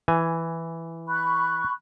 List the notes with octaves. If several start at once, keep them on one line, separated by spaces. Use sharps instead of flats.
E3 G#5
B5 C#6 F#6